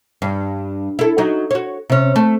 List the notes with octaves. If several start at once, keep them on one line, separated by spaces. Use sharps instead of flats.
G2
E4 A4
F#3 D#4
F#4 C#5
C3 C#4
A3